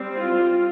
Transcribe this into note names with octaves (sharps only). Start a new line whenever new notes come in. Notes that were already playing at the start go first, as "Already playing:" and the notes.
Already playing: G3 C4
F4